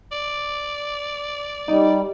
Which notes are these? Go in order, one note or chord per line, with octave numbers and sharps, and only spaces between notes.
D5
G3 D#4